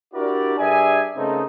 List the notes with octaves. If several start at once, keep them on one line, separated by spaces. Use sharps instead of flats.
D4 E4 F#4 G4 A#4 D5
G2 G#4 D5 E5 G#5
C#3 A3 A#3 C4 D#4